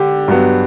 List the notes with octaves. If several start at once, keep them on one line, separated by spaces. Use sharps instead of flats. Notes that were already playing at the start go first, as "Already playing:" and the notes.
Already playing: D3 G4
G2 F#3 B3